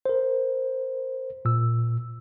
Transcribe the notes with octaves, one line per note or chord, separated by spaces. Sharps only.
A#4 C5
A#2 E6